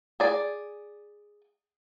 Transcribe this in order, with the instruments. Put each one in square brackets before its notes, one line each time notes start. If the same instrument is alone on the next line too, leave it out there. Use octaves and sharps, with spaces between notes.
[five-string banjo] G#4 D5